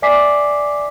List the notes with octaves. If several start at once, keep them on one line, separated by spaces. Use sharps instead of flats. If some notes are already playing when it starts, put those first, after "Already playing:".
D5 E5 G#5 D6 B6 C7